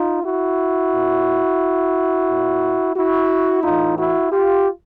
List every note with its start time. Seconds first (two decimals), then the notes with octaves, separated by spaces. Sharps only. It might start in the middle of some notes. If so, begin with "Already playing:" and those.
Already playing: D#4 F4
0.24 E4 F#4
0.92 A#2
2.28 A#2
2.96 E4 F#4
3.64 A2 E3 D#4 F4
3.98 E4 F#4
4.32 F4 G4